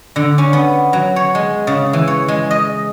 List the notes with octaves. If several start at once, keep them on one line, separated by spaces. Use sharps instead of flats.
D3
C#4
B3
F#3
C#5
G#3
C#3
E3
C#5
G#3
D#5